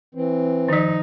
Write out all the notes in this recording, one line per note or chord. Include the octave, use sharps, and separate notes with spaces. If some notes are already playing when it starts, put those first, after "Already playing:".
E3 C4
D#3 F3 D#4